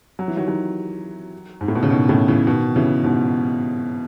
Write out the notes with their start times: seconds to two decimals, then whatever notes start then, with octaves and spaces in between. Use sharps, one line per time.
0.19 F#3
0.28 E3
0.37 D#3 F#3
0.47 D#3 F#3
1.61 G#2
1.68 A2
1.75 B2
1.83 C#3
1.90 B2 D#3
2.09 A2 C#3
2.28 C#3 E3
2.47 B2 D#3
2.76 C#3 E3
3.04 G#2 B2